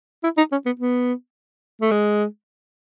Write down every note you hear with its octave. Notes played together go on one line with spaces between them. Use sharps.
E4
D#4
C#4
B3
B3
A3
G#3